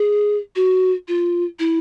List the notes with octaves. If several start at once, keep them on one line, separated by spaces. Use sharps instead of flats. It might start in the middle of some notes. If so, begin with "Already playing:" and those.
Already playing: G#4
F#4
F4
E4